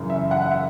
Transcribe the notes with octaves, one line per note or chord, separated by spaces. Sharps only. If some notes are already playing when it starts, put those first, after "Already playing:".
Already playing: F#2 C#3 E3
E5
F#5
F#5
E5